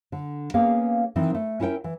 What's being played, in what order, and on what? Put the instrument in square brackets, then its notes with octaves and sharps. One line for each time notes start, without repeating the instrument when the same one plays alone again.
[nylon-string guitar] D3
A#3 B3 C#4 G#4 F5
D#3 E3 C4 D#4
A3
C#4 E4 A#4 F#5 G5
E3